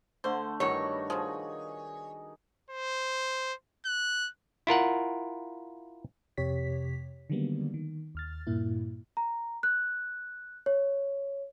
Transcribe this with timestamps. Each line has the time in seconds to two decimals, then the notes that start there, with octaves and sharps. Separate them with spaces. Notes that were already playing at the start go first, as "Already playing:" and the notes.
0.24 D3 A3 C5
0.60 G2 D#3 E3 F#3 E4 F#4 C#5
1.10 B2 F3 G#4
2.70 C5
3.86 F#6
4.67 E4 F4 A#4 F#5
6.37 F2 C3 G4 C#5 B6
7.30 D3 D#3 F#3 G3 A#3 B3
7.74 D#3
8.15 D#2 F6 A6
8.47 G2 A#2 A#3 E4
9.17 A#5
9.63 F#6
10.66 C#5